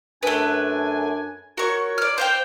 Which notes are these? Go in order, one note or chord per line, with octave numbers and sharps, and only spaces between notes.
F#2 A3 D4 B4 G#5
F#4 A#4 C#5 C#6
D5 F6
C5 F5 G5